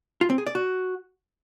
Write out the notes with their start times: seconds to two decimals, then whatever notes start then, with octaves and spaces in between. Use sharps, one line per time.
0.21 F4
0.30 C4
0.38 G#4
0.47 D5
0.55 F#4